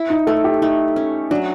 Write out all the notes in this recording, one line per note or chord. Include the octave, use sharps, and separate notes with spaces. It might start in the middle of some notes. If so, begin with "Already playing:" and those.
Already playing: E4
D#4
A3 A4
G4
A3 D#4
C#4
F#3 D4